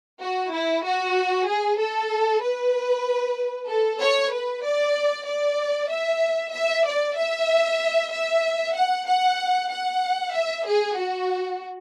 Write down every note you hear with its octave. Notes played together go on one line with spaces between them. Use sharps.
F#4
E4
F#4
G#4
A4
B4
A4
C#5
B4
D5
D5
E5
E5
D5
E5
E5
F#5
F#5
F#5
E5
G#4
F#4